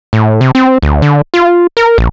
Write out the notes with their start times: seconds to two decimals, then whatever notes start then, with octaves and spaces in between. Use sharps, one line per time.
0.13 A2
0.41 C3
0.55 C4
0.82 D2
1.02 D3
1.34 F4
1.77 A#4
1.98 A#1